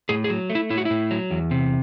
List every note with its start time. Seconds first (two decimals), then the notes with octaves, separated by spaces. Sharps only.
0.09 A2 G#4
0.24 G#4
0.30 F#3
0.50 A3
0.55 E4
0.70 A2 E4
0.78 F#4
0.85 A2 E4
1.11 F#3
1.30 E2
1.51 C3